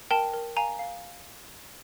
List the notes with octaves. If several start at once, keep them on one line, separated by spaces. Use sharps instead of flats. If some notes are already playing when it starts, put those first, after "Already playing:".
A#4 G5 A5
A#4
F5 G#5 A#5
F5